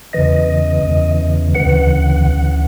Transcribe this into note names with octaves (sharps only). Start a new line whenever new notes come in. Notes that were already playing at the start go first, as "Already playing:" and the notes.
E2 C#3 E3 D#5
E2 C#3 E3
D2 C#3 E3 F#5
D2 C#3 E3